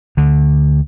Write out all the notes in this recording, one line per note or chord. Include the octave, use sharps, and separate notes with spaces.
D2 D3